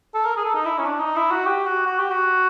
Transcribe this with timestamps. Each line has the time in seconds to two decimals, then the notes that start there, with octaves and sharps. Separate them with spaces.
0.14 A4
0.25 A#4
0.37 G#4
0.45 A4
0.55 D#4
0.66 E4
0.79 C#4
0.86 D4
1.00 D#4
1.16 E4
1.31 F#4
1.46 G4
1.66 F#4
1.86 F#4
1.99 G4
2.11 F#4